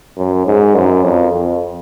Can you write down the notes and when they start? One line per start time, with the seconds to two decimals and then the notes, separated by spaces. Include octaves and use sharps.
0.17 F#2
0.47 G#2
0.75 F#2
1.04 F2
1.32 F2